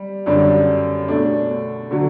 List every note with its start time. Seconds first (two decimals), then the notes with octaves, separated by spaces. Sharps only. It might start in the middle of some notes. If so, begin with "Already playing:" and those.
Already playing: G3
0.26 F#2 D3 G3 D4
1.08 B2 A3 D4
1.91 D3 F#3